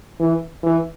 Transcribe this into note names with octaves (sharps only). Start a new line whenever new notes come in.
E3
E3